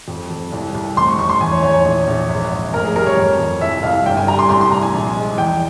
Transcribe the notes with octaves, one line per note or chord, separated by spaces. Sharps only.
F2
F2
C2
C2
F1 C6
C#6
F1 C#6
C6
E2 G#5
C#5
E2 C#5
C#5
A#1
A#1
G#1
G#1
F1 A#4
G#4
G3 A#4
C#5
F2
F2
C2 E5
C2 F5
G1 G5
G#5
G3 A#5
C6
C2 C6
C6
C2 A#5
G#5
A#1
G#3
E2 G5